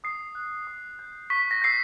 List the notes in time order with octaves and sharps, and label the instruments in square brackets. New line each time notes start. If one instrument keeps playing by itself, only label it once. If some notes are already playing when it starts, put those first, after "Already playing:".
[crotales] D#6 C7
F#6
D#6
G6
C#6 B6
A#6
E6 G6 C7